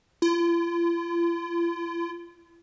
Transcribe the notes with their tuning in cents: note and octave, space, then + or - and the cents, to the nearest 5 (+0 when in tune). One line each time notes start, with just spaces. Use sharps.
F4 -45